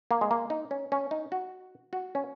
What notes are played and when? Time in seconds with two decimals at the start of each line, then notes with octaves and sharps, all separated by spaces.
0.11 A#3
0.21 G#3
0.31 A#3
0.50 D#4
0.71 C#4
0.92 C#4
1.11 D#4
1.32 F#4
1.93 F#4
2.15 C#4